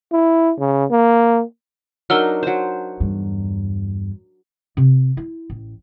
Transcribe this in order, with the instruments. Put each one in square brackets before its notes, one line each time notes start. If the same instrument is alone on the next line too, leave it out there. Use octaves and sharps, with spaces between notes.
[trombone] E4
C#3
A#3
[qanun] F#3 D4 D#4 [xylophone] A#4 E6 F6
[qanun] F#3 C5
[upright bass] E2 G2
C3
E4
A1